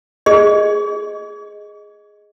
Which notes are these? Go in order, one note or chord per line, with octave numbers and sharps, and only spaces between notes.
G#4 D#5